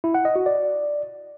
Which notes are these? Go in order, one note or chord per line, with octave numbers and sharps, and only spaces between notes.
E4
F#5
D#5
F#4
D5